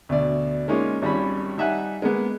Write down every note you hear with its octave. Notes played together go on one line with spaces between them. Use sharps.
D2 B2 D5
G#3 A#3 C#4 D#4 F4
G#1 G3 C#4 B5
G3 D#4 E5 F#5 G#5 F#6
G#3 A#3 B3